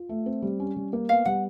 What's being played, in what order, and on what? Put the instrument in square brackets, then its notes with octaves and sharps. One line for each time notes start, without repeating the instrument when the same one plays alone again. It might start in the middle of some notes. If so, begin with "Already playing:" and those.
Already playing: [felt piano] F4
A3
C4
G3
C#4
G3
A#3
[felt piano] B3 [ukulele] F5
[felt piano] G3 [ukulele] F#5